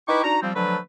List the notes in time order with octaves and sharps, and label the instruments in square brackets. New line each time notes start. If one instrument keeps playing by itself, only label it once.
[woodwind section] D#4 E4 B4 G5 C#6 D6
D4 D#4 F#4 A#5
F3 G3 C4
D3 F3 F#3 A3 B4